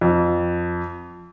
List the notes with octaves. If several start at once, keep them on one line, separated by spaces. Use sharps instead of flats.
F2